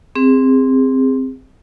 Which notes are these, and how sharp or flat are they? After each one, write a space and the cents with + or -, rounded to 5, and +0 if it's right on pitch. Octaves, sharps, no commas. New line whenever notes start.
C4 +0 G#4 -30